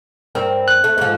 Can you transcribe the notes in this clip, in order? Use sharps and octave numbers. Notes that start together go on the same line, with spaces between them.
G2 C4 A#4
F#6
A3
G#2 F3